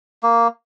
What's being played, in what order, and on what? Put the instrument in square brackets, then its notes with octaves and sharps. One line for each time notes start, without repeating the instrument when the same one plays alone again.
[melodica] A#3